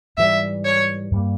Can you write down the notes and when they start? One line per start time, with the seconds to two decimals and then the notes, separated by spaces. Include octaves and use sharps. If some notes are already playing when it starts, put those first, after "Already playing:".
0.18 G#2 E3 G3 E5
0.65 C#5
1.11 G2 G3 A#3